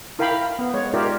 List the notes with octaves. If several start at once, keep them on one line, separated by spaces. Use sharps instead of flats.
E4 A#4 F5 G5 B5
B3
G#3 C#5
D#4 F4 G4 A#4 D5 E5